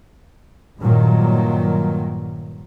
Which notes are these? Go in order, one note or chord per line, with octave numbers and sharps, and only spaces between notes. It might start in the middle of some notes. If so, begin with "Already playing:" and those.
G2 A#2 D#3 F#3